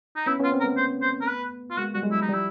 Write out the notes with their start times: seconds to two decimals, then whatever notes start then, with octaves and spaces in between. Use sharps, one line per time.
0.16 D#4
0.26 B3 C#4 E4
0.39 B3 C#4
0.44 F4
0.51 A#3 C4
0.60 A#4
0.64 A3 B3
0.77 C5
1.02 C5
1.21 A#4
1.28 B4
1.70 F4
1.77 G#3 A#3 F#4
1.94 G3 F#4
2.02 F#3 G#3
2.11 E4
2.22 D#4
2.29 F3 G3 E4